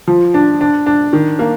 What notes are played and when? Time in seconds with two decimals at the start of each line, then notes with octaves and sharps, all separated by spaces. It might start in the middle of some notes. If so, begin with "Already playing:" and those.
0.08 F3
0.34 D4
0.61 D4
0.86 D4
1.13 D#3
1.39 A#3